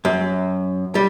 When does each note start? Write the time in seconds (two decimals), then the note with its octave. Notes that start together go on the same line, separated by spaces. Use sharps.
0.05 F#2
0.95 G3